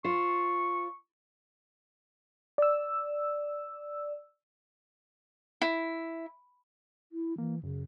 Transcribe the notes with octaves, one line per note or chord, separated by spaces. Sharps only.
F4 C5 C#6
D5 E6
E4
E4
E3 A#3
F#2 C#3